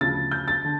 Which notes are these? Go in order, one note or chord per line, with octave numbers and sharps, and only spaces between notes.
D2 C#3 F3 A6
G6
A6
D3